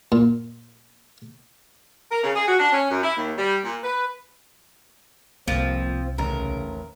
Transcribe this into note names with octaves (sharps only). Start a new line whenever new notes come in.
A#2
A#4
C#3
G#4
F#4
D4
C#4
F#2
E4
D#2
G3
A#2
B4
F1 C2 F#2 F3 A#3 C4
A1 D#2 C#3 A#4